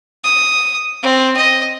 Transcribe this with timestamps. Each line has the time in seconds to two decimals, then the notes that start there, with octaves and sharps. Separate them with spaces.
0.24 D#6
1.03 C4
1.37 D#5